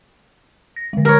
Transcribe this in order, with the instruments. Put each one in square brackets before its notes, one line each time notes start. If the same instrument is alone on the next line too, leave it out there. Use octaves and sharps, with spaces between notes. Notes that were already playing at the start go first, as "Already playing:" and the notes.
[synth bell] A#6
D3 G#3
[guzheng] A#4 C#5